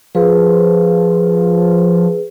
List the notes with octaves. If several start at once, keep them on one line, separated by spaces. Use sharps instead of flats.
F3 G#4 B4